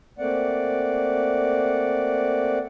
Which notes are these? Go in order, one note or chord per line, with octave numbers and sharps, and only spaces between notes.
A3 A#3 C4 D5 F#5